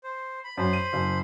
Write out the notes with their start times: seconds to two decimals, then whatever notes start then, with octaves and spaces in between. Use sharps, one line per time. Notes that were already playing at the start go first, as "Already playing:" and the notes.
0.04 C5
0.44 B5
0.57 F#2 C5 B5
0.73 D#7
0.93 F#1